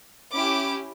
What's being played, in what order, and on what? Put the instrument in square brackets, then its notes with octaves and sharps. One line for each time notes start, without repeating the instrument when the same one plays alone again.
[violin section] C#4 E4 G4 D6